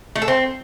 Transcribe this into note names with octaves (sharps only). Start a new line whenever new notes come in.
A3
A4
C4